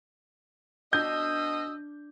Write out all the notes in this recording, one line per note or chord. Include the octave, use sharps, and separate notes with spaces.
B2 D4 D#5 E6 G6